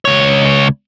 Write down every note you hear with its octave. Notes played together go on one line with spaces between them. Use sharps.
C#2 C#5